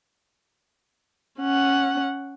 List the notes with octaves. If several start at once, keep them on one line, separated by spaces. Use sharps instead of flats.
C#4 F#5